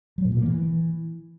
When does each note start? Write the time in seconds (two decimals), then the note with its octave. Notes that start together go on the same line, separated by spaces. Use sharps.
0.18 F#3
0.25 A2
0.32 A#2
0.39 A#3
0.46 E3